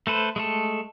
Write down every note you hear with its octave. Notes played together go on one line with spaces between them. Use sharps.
A3 A4 B4 C5
G#3 A3 A4